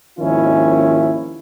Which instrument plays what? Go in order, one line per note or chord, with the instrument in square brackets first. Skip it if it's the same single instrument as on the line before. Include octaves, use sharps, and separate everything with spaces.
[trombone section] G#1 D#2 D#3 F3 C#4 E4